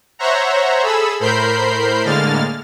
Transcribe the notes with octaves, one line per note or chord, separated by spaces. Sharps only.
C5 C#5 E5 F#5 A#5
G#4 A4 B5 E6
A2 A#4 C5 B5 G6 C7
A2 D3 G#3 A#3 F6 A6